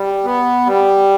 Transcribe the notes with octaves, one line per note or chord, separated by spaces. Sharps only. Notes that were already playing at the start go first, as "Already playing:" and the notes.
Already playing: G3
B3
G3